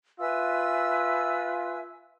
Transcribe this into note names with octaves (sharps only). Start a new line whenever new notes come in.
F4 B4 E5 G#5 E6